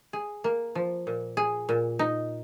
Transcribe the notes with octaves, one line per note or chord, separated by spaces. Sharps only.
G#4
A#3
F3
A#2
G#4
A#2
D#4